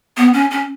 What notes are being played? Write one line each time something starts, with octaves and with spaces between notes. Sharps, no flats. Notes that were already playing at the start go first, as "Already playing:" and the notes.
B3
C#4
C#4